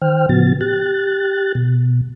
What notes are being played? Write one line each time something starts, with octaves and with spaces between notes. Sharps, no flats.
D#3 C5 G5 F6
A2 C#3 F3 B3 F#4 A6
G4 F#6 A6
B2